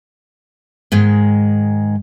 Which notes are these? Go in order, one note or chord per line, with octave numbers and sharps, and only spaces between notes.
G#2 D#3 G#3